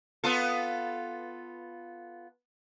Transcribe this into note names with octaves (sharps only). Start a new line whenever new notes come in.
B3 F4 A4